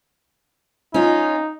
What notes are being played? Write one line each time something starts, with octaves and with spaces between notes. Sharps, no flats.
C#4 D#4 F4